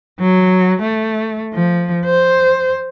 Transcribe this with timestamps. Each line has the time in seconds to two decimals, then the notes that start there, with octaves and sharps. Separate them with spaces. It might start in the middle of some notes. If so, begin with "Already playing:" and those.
0.20 F#3
0.82 A3
1.54 F3
2.05 C5